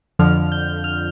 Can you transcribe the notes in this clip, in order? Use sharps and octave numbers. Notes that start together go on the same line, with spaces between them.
F2 D3 F3 F6
G6
F6